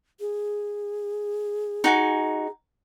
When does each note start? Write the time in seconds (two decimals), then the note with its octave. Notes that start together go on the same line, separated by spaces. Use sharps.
0.20 G#4
1.84 D#4 F#4 G#5